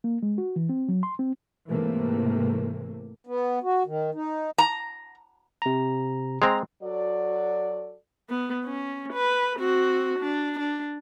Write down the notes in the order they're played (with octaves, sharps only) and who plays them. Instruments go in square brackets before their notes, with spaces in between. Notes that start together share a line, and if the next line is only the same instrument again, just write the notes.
[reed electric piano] A#3
G#3
F#4
E3
C4
F#3
C6
C4
[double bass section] G#2 C3 E3 A3 A#3
[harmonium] B3
F#4
D#3
D#4
[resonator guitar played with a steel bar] A#5
[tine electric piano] C3 A#5
[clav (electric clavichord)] G#3 C4 [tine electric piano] A#5
[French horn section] F#3 F#4 A4 D5
[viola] B3
C#4
B4
C4 F#4
D4
D4